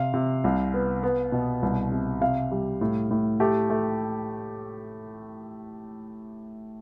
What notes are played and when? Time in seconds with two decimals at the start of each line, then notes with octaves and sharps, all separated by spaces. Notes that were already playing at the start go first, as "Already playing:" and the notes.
Already playing: C3 F5
0.14 C3
0.44 C2
0.74 B3
1.03 B3
1.32 B2
1.62 C2
1.92 C3
2.21 C3 F5
2.51 G3
2.81 A2
3.11 A2
3.40 A3 G4
3.70 A3